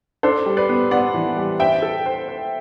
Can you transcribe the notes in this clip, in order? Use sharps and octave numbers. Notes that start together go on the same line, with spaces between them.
D4 A4 C5
G3
B4 D5
B3
B3 D5 F#5
E3
G3
C5 E5 G5
A4
C5
C5